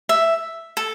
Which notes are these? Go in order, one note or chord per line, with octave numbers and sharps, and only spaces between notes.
E5
A4